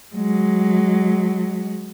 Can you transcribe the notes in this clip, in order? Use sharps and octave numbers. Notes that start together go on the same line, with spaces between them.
F#3 G#3